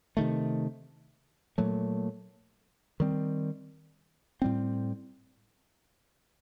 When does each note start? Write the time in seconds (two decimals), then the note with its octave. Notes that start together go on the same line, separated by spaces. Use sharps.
0.17 C3 D#3 A3
1.58 A#2 F#3 A3
3.00 D#3 G3 C4
4.42 A2 G3 C4